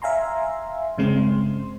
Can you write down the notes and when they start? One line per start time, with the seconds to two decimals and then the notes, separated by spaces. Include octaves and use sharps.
0.02 E5 F5 G#5 A#5 C6
0.98 G1 C#3 G#3 C4 C6